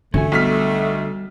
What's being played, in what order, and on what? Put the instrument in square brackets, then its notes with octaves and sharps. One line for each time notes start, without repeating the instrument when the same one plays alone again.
[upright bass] D3 [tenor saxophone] A3 [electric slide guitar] C#4 F#4 G#5
[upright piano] B1 F6 B6 [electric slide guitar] G3 A4